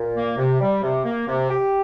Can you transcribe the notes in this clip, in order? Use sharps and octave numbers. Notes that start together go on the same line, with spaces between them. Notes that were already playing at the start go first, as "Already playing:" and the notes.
Already playing: A#2
A#3
C3
G3
C3
A#3
C3
G4